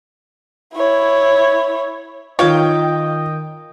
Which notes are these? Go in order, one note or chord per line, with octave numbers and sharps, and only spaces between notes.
E4 C#5
D#3 F4 C#5 D#5 F5 G5